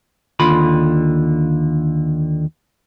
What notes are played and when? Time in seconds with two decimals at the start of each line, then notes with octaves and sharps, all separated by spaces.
0.40 D#2 D3 F4 B5